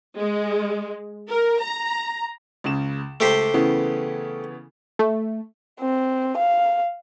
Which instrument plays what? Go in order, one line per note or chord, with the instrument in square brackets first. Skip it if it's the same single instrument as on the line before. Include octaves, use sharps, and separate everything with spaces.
[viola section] G#3
A#4
A#5
[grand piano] C#2 C#3 E7
[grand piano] C#2 [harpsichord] A3 G4 C5
[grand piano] C#3 E3 B3
[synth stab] A3
[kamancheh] C4
F5